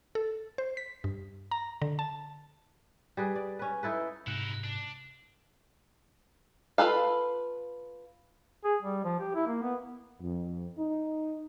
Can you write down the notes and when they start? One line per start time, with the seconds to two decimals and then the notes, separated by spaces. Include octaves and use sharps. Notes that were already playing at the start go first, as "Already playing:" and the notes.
0.15 A4
0.58 C5
0.77 B6
1.04 G2
1.51 A#5
1.82 D3
1.99 A5
3.17 G3 G#4 B4
3.36 D5
3.59 C#4 B4
3.83 D#4 E4 A4 B4
4.27 G#2 C3 D#4 E4 F#6
4.64 D4
6.78 F4 A4 B4 F5
8.64 G#4
8.82 G3
9.04 F3
9.20 G4
9.35 E4
9.48 A#3
9.62 B3
10.20 F2
10.78 D#4